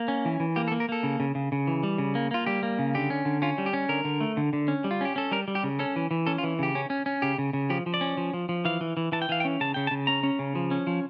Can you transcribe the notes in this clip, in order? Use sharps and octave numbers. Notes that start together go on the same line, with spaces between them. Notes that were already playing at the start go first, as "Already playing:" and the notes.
Already playing: A#3
C#4
E3
E3
A#3 G4
A4
A#3
A#4
A#3 A4
C#3
C#3
C#3
C#3
E3
G3
C#3
A#3
A#3 F4
G3 G4
A#3
C#3
D3 G4
C#4
D3
C#4 F4
G3
G4
C#4
D3 A#4
D3
A3
D3
D3
C#4
G3
F4
C#4 G4
C#4 A4
G3 A#4
G3
G4
C#3
C#4 A4
E3
E3
C#4 A4
F4
E3
C#3 G4
C#4
C#4
C#4
C#3 G4
C#3
C#3
F3 G4
F3
D5
C#4
F3
F3
F3
E3 F5
E3
E3
E3 A5
G5
E3 F5
G5
C#4
C#3 A5
C#3 G5
A5
C#3
C#4 A#5
C#4
C#3
F3
C#4
F3